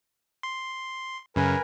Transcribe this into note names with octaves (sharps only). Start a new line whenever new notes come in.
C6
F#2 C#3 A#4 B4 G#5